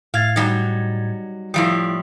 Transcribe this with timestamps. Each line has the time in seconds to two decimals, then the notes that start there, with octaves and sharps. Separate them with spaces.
0.14 A2 F5 G#6 A6
0.36 F#3 G3 D#4
1.54 A2 F3 G3 E4 D#6